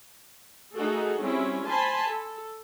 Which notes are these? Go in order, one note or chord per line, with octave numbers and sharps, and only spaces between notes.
A3 D#4 F#4 G#4 A4
G3 C4 C#4 E4
C5 G#5 A5 B5 C6
A4